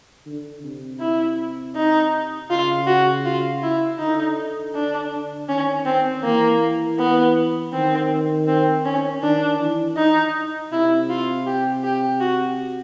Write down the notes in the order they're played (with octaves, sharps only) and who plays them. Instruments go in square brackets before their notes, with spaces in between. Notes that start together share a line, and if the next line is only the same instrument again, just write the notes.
[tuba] D3
C3
[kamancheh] E4
D#4
[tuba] C#3 [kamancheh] F4
[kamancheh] F#4
F4
E4
[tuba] D3 [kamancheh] D#4
[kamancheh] D4
[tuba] D#3 [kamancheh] C#4
[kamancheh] C4
[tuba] E3 [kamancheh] A#3
[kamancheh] B3
[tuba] D#3 [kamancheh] C4
[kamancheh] C4
C#4
[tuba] D#3 [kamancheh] D4
[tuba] E3
[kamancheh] D#4
[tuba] C3 [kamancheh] E4
[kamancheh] F4
G4
G4
F#4